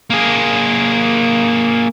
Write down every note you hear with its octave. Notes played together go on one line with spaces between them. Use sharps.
A#3 G#4